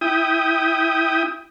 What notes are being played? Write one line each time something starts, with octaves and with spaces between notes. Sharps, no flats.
E4 G5 D#6